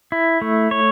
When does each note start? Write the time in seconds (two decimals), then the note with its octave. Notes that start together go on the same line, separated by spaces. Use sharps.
0.12 E4
0.42 A3
0.71 C#5